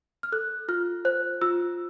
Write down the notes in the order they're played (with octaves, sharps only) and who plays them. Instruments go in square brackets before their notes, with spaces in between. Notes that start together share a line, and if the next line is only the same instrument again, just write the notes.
[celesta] F6
A4 F#6
F4 F6
C5 F#6
F4 E6